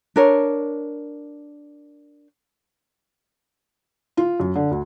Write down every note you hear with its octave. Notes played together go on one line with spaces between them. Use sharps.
D4 A#4 C#5
F4
F#2
D3
D2